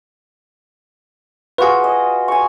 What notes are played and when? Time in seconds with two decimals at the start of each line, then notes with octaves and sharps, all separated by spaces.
1.58 F4 F#4 G#4 B4 F#5
1.84 D#5
2.28 G#5 C#6